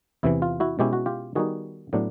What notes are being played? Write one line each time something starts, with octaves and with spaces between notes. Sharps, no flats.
E2 C3 E3 E4
F4
E4 F#4
B2 G#3 C#4 E4 G4
F#4
F4 G4
D#3 G3 B3 D#4 F#4 G#4
A2 F#3 B3 D4